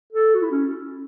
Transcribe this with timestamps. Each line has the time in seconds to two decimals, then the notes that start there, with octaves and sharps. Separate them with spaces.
0.13 A4
0.35 F#4
0.43 E4
0.51 C#4